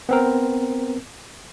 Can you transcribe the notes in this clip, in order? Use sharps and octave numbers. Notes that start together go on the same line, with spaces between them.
B3 C4 A#4